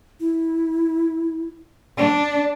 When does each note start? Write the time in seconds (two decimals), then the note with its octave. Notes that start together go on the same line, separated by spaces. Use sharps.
0.20 E4
1.98 D4 D5